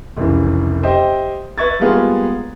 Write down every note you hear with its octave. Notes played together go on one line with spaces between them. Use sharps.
F1 C2 C#3 E3
G4 C5 D#5 E5 G5
B4 E5 C#6 G#6 A6
G3 G#3 A#3 B3 F4 G#4